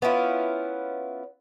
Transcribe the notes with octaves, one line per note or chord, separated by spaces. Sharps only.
B3 C#4 E4 F4